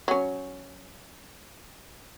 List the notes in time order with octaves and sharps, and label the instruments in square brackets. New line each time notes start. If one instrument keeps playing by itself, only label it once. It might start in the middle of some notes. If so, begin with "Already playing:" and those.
[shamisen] F#3 C#4